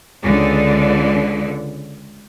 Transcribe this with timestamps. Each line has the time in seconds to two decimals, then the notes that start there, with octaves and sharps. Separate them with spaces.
0.24 C#2 D3